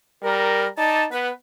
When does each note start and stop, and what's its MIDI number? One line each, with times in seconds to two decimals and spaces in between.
0.23 0.67 55
0.23 0.67 70
0.78 1.06 63
0.78 1.05 74
0.78 1.05 81
1.11 1.30 59
1.11 1.29 71